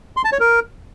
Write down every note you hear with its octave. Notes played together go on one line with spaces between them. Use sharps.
C6
A5
C#5
A#4